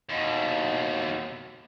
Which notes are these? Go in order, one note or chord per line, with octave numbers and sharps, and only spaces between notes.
D#2 B2